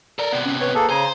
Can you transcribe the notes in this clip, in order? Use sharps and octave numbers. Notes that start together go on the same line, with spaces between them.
A4 A#4 D5
C3 B3
C#4
B4 C#5
A#3 G#4 A4
C#3 C5 G#5 A#5